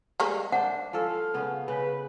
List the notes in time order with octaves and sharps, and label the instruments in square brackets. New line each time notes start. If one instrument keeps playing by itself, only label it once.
[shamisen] G3 G#3 A#3
[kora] D4 C5 [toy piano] F#5
[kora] F3 C#4 A4 [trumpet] F5
[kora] C#3 B3 C#4
[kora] C#3 [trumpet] B4